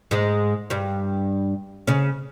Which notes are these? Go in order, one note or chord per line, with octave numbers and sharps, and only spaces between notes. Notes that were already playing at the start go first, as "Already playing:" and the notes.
G#2 G#3
G2 G3
C#3 C#4